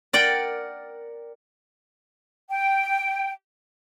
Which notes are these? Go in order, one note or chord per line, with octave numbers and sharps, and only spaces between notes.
A#4 D5 F#5 G5
G5